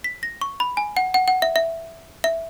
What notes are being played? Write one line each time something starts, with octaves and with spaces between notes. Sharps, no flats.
B6
A#6
C#6
B5
G#5
F#5
F#5
F#5
E5
E5
E5